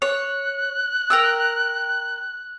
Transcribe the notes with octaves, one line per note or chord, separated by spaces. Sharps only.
C#5 F#6
A#4 G5 E6